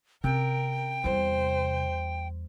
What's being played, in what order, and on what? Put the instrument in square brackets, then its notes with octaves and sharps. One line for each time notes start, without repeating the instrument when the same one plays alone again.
[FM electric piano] C3 [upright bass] C#4 [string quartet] A#4 [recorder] G5
[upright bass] E2 G3 [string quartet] C5